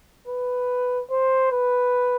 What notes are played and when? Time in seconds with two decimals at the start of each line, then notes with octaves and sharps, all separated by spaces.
0.27 B4
1.10 C5
1.51 B4